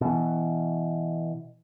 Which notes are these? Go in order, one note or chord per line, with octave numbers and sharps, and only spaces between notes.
B2 E3